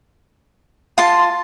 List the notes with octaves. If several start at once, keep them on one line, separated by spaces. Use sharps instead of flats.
F4 A5 C6